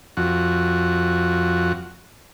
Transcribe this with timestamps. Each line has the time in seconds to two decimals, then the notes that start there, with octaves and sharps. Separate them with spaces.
0.17 F2 F#4